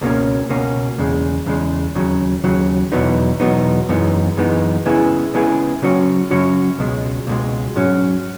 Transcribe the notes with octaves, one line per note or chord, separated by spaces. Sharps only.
C#2 B2 A#3 C#4
C#2 B2 A#3 C#4
E2 C#3 G#3
E2 C#3 G#3
D#2 C#3 F#3
D#2 C#3 F#3
E2 B2 F#3 B3 D#4
E2 B2 F#3 B3 D#4
F#2 E3 G#3 B3 D#4
F#2 E3 G#3 B3 D#4
C#3 G#3 B3 E4 G#4
C#3 G#3 B3 E4 G#4
C#3 F#3 C#4 F#4 C#5
C#3 F#3 C#4 F#4 C#5
C#2 B2 G#3
C#2 B2 G#3
G#2 F#3 C#4